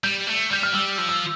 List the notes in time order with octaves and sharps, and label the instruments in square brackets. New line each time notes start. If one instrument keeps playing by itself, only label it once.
[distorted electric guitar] G3 [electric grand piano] G6
[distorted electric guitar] A3
[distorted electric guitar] G3 [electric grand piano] G6
[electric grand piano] F6
[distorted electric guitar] G3 [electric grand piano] E6
[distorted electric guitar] F3
[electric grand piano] E6